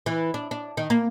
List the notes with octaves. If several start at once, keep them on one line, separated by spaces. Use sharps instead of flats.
E3
D4
D4
D#3
A#3